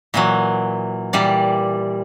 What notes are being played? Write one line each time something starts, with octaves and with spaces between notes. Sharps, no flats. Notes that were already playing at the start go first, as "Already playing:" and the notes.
A#2 E3 F#3
A#2 E3 G3 D5